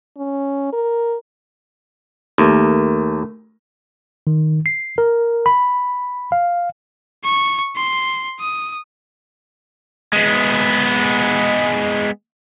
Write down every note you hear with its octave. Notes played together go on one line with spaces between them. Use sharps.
C#4
A#4
D#2 A3 A#4
D#3
C7
A#4
B5
F5
C#6
C6
D#6
G#3 B3